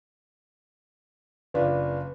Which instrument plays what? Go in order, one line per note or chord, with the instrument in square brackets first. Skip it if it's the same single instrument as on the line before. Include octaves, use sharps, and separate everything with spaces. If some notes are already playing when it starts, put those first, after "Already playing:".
[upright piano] F#1 D4 F4 [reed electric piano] B4